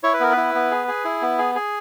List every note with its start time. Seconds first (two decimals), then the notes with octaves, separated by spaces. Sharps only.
0.03 E4 C#5
0.13 B4
0.20 B3 A#4
0.32 B4
0.37 E4
0.55 B3
0.71 G#4
0.88 G#4
1.05 E4
1.22 B3
1.38 G#4
1.55 G#4